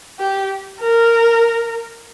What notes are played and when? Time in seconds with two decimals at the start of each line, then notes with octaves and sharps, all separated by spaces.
0.19 G4
0.81 A#4